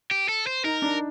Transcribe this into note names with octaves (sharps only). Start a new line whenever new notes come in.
G4
A4
C5
D#4 A#4
D4